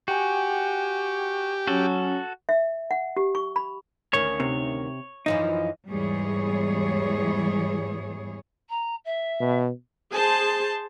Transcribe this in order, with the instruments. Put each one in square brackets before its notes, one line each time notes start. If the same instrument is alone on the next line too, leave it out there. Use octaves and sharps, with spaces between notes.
[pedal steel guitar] F#4 [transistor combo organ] G4 [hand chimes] G5 G#5
[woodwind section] F#3 C#4 [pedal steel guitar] F#4 A4
[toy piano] E5
F#5
G4
C#6
B5
[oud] D2 D#3 C#4 [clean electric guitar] C#5
[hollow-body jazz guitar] C3
[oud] F#2 E3 F3 [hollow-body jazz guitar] D#4
[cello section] E2 G#2 E3 G3 G#4 C#5
[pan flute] A#5
E5
[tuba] B2
[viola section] G#4 C5 A5